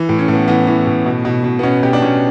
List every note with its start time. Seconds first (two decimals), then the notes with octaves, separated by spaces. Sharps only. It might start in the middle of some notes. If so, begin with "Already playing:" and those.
Already playing: E3
0.09 A2
0.19 C#4
0.28 A2
0.33 B3
0.48 E3 B3
0.67 E3
0.87 A2
1.06 B2
1.25 B2
1.44 B2
1.59 B3
1.63 B2 C#4
1.83 B2 G4
1.93 D4
2.02 B2 C#4